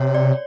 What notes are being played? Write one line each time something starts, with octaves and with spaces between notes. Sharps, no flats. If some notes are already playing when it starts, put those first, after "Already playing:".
Already playing: C3 C#5
D5